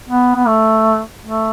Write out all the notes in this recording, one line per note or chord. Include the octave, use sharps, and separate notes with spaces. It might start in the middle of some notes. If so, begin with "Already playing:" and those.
B3
B3
A3
A3